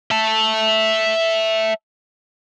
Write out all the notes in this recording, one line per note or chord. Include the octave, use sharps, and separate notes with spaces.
E5 A5